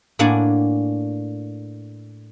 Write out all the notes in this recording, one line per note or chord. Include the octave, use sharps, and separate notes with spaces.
A2 A#3 D4 D5 F#5 G#5